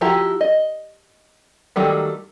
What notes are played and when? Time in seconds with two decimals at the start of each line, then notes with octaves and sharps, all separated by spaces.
0.01 F3 E4 F#4 G4 A#5
0.41 D#5
1.76 D#3 F#3 G3 A3